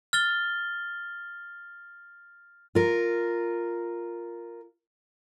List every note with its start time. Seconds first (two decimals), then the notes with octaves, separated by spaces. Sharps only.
0.13 F6 A6 G7
2.75 F4 A#4